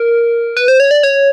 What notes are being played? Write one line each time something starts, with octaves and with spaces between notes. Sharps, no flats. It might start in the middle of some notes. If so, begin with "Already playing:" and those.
Already playing: A#4
B4
C5
C#5
D5
C#5